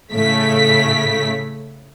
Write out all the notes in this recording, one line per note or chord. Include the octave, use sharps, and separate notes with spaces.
A2 C#3 A3 B6